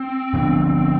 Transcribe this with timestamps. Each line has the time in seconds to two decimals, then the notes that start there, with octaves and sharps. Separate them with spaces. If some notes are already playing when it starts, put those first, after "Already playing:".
Already playing: C4
0.34 D3 F3 B3 D4